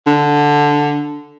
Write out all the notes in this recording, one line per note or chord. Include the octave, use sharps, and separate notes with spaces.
D3